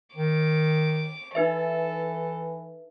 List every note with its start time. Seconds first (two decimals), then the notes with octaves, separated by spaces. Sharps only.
0.16 D#3 D6
1.35 E3 D#4 A4 B4 E5